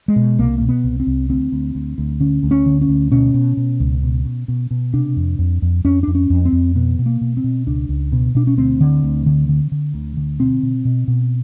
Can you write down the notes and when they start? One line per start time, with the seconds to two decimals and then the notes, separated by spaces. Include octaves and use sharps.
0.08 G#3
0.16 B2
0.38 C2 A#3
0.58 B2 A#3
0.69 B3
0.84 C2
1.00 C4
1.07 C2
1.30 D2 C4
1.52 D2
1.75 D2
1.98 D2
2.20 D3 C#4
2.43 D2
2.51 C#4
2.66 D3
2.81 C#4
2.89 D2
3.12 B2 C#4
3.34 B2
3.57 B2
3.80 C#2
4.03 B2
4.25 B2
4.48 B2
4.71 B2
4.94 C3 D4
5.16 F2
5.39 F2
5.62 F2
5.85 F2 C#4
6.03 F2 D4
6.15 C#4
6.30 F2
6.45 C4
6.52 F2
6.75 B2 B3
6.99 B2
7.06 A#3
7.21 B2
7.37 C4
7.44 B2
7.66 C#2 D4
7.89 C#2
8.12 B2
8.35 B2 D4
8.47 C#4
8.57 D2 C4
8.81 D3
9.03 D2
9.26 D3
9.49 D3
9.72 D3
9.94 D2
10.17 D3
10.39 B2 C4
10.63 B2
10.85 B2
11.08 B2